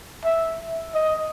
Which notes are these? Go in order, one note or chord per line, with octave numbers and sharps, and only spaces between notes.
E5
D#5